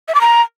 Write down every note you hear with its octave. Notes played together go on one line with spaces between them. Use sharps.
E5
D6
A#5